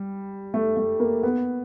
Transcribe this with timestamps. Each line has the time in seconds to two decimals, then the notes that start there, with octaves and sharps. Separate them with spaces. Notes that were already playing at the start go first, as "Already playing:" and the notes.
Already playing: G3
0.54 A3
0.77 A3
1.00 A#3
1.23 B3